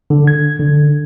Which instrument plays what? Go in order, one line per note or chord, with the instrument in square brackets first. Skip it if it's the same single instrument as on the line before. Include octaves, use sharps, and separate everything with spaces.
[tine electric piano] D3
G#6
D3